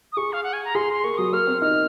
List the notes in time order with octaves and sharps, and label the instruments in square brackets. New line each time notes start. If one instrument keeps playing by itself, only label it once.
[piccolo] D#6
[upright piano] G#4 [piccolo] C#6
[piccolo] F5
F#5
G#5
A#5
[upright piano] G#4 [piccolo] C6
[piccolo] C6
[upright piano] A#3 [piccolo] C#6
[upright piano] F#3 [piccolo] D#6
[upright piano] A#3 [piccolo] F6
[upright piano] C4
[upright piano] D#4 [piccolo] F6